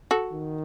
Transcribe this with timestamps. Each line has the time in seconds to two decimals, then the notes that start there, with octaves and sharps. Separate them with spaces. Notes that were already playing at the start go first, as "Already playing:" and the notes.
0.11 F#4 A4
0.33 D#3